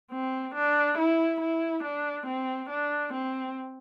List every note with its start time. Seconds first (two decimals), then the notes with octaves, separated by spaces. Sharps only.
0.12 C4
0.55 D4
0.98 E4
1.41 E4
1.84 D4
2.27 C4
2.70 D4
3.14 C4